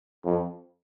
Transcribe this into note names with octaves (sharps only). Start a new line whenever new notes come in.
F2